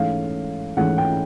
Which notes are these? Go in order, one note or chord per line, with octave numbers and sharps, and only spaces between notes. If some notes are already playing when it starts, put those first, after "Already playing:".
Already playing: G#2 E3 A3 C#4 F5
G#2 E3 A3 C#4 F#5
G5